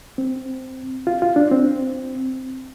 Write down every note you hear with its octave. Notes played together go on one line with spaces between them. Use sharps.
C4
F4
F4
D4
C4